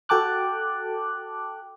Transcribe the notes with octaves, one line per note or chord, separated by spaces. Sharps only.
F#4 A4 G5 A5 D6 F#6